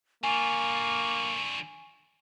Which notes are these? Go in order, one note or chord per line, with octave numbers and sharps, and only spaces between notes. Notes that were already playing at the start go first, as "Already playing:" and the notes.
D3 A#3 F4 G#5 C#6